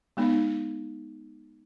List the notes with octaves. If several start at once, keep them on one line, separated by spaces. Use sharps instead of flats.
G#3 B3 D#4